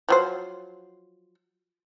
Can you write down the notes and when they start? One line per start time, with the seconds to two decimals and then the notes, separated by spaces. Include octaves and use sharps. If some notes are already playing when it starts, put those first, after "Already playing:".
0.09 F3 F#3 C5